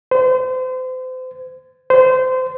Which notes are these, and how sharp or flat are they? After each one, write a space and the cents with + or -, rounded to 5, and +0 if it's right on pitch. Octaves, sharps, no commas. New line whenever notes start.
C5 -35
C5 -25